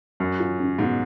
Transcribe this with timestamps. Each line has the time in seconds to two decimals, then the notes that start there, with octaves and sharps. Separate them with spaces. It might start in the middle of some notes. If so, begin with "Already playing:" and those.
0.20 F#2 F#3
0.40 F4
0.60 C#4
0.79 G#2 B2